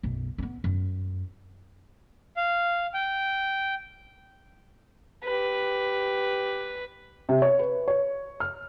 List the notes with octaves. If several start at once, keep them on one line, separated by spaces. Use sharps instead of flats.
B1 F#2
B3 D4
F#2
F5
G5
G4 B4
C3
C#5
B4
C#5
F6